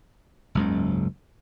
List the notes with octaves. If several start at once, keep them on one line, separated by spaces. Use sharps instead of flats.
F#1 C#2 G#2